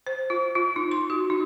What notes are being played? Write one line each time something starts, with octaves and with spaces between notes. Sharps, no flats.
C5
F4
F4
D#4
C6
F#4
D#4